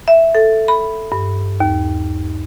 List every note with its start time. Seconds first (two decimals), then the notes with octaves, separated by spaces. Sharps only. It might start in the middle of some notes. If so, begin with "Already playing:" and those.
0.08 E5
0.35 A4
0.68 B5
1.12 G2
1.60 D#2